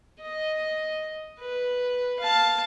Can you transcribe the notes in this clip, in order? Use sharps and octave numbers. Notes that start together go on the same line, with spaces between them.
D#5
B4
F5 A5